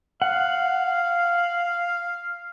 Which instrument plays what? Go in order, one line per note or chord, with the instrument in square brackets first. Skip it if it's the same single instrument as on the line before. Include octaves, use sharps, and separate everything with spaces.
[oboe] F5 [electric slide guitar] F#5